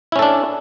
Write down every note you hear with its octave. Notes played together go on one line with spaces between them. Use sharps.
C#4 D4 E4 A4